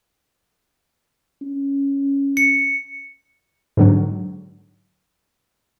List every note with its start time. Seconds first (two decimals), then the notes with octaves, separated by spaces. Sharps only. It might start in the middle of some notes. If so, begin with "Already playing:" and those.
1.42 C#4
2.37 C#7
3.77 G#2 D3 F#3